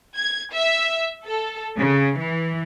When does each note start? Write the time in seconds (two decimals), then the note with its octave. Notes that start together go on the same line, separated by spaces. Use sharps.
0.16 G#6
0.52 E5
1.25 A4
1.78 C#3
2.17 E3